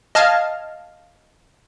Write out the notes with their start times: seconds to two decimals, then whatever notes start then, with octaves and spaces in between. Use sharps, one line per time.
0.15 D#5 F5 A5 F6 G#6